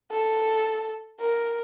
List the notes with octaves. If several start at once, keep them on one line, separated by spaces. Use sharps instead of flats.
A4
A#4